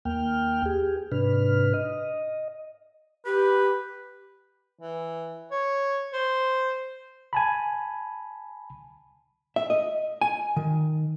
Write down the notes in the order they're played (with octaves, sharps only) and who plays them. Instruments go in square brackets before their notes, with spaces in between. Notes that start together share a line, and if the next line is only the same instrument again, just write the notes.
[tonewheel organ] D#2 A#3 G5 F6
G4 G#4
G#2 C3 D4 B4 F6
D#5
[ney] G4 [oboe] B4
[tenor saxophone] E3
C#5
C5
[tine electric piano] G#5 A5 B5
[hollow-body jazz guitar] E5
D#5
G#5
D#3